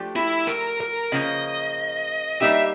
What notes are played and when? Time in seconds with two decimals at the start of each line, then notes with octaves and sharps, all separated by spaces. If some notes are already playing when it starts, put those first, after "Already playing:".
Already playing: F3 A3 D4 G4
0.16 E4
0.47 A#4
0.80 A#4
1.12 C#3 F3 A#3 D#5
2.41 G3 A#3 D#4 G4 E5